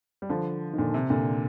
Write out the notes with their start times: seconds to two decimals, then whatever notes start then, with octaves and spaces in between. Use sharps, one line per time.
0.22 G3
0.29 D3 F3
0.73 D#3
0.78 A#2 D3
0.94 C3
1.10 A#2 D3